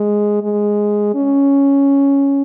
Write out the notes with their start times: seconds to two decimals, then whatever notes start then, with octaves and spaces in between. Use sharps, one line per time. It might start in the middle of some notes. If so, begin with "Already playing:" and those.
Already playing: G#3
0.43 G#3
1.15 C#4